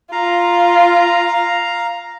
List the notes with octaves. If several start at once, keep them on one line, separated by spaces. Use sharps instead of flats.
F4 F5 A#5